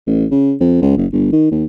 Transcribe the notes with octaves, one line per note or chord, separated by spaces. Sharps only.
A1
C#3
F2
C#2
F#1
G1
D#3
D#2